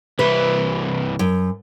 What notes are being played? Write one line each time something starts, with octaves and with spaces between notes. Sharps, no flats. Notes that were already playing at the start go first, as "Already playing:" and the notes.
C2 E3 B4
F#2